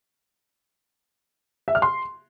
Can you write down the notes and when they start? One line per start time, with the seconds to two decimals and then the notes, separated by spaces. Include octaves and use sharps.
1.68 E5
1.75 F6
1.82 C6